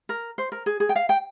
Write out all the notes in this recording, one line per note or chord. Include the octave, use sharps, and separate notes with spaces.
A#4
C5
A#4
G#4
G#4
G5
F5
G5